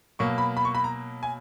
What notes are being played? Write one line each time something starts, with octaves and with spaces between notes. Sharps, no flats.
B2 F#3 A#3 C#6
B5
B5
C#6
B5
A#5
G#5